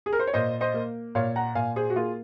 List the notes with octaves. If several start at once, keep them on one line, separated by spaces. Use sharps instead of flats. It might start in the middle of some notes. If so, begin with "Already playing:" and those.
G#4
A#4
C5
C#5
A#2 C5 D#5
C5 D#5
A#3
A#2 C#5 F5
F#5 A#5
A#2 F5 G#5
G#4 C5
F#4
A#3 F4 G#4